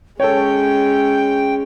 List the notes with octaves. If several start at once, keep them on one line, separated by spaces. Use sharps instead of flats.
G#3 C#4 A4 C#5 G5